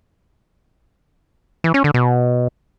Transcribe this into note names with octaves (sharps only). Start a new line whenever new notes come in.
E3
C#4
D3
B2